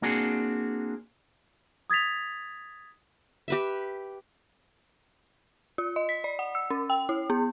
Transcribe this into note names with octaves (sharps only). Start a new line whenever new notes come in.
A#3 C4 D4 F#4 G#4
D#6 G#6 A6 B6 F7
G4 B4 E5
F4
D#5
B6
D5
F#5
E6
C#4
G5
E4
B3